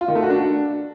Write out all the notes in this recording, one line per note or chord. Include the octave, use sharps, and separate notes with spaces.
F4
D#3
A3
F#4
D4